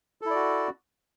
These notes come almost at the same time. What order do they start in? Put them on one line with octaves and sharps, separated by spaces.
A4 E4 D5 F#4